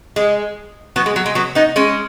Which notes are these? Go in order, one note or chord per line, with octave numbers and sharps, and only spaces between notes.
G#3
F#3 B3
G#3
F#3
G#3
F#3 B3
B3 D#4
G#3 C#4